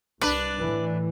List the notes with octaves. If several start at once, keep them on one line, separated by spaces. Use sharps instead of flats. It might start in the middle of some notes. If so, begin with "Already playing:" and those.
C2 D4 B4 D5
A2 E3